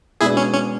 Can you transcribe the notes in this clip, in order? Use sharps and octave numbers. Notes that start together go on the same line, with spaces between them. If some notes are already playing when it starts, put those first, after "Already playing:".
B2 G#3 B3 D4 E4 G#4
C#4
C#4